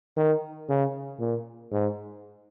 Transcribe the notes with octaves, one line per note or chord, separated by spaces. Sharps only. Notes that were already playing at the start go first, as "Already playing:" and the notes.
D#3
C#3
A#2
G#2